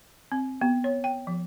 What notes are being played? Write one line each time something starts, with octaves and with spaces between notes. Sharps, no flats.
C4
B3
C#5
G5
F3